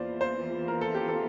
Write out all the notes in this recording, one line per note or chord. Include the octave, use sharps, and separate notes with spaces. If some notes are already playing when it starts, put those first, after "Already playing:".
Already playing: E2 E3 A#3 F4 C5 D5
C5
A#4
A4
G4
A4